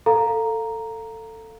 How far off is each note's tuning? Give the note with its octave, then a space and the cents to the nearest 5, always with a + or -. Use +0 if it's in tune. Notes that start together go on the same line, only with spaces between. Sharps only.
A4 +15 F5 +5 A#5 +0